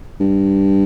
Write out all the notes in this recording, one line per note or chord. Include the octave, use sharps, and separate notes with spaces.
G2